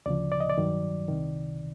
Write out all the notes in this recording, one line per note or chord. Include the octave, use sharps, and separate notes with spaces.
D2 C#3 F3 D5
D5
D#5
D5
G2 D#3 F#3
C2 C3 D#3